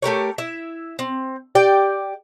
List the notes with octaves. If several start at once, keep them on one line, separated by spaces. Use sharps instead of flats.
A3 G4 A#4 C#5
E4 E5
C4
G4 D5 G5